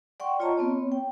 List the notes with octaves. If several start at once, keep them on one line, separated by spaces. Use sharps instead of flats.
D5 F#5 G5 C6 C#6
F4 C#5 D#5 A5 A#5 C#6
B3 C4 C#5
G5